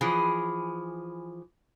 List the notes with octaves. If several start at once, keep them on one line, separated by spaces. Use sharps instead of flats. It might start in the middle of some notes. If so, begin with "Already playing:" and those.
E3 F3 G#4